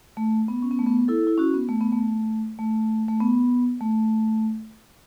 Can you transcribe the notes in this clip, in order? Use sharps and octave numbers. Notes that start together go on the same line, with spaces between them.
A3
B3
C#4
B3
A3
B3
E4 A4
E4
C#4 F#4
B3
A3
B3
A3
A3
A3
B3
A3